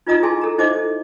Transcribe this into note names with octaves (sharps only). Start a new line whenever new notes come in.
D#4 F4 B4 D#5 A#5 D#6
E4 G#4 G#5 A5 C6
A4 A#5
D#4 E4 C5 D#5 E5 D6
A4